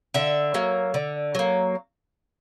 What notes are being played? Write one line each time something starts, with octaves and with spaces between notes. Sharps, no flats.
D3 E5
F#3 A#3
D3
F#3 A#3